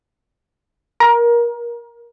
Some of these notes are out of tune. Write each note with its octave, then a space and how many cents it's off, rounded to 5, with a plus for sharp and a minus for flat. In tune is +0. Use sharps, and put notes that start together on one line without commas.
A#4 +25